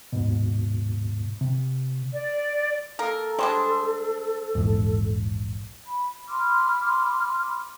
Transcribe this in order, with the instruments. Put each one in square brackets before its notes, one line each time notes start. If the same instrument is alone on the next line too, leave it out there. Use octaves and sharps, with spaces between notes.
[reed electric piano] D#2 G#2 B2
C3
[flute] D5
[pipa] A#3 A#4 [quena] A4
[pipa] G3 G#3 D4 [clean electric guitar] C5
[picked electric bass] A#1 E2 G#2
[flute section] B5
B5 C6 D6 F6